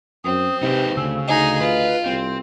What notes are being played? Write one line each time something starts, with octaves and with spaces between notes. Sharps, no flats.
F#2 C4 D#6
C3 D#4 G4 B4 G5
D2 C#3 E6
D2 D#4 G#4 D#5
F4 B4
C2 C4